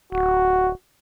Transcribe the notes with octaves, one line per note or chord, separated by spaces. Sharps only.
D1 F#4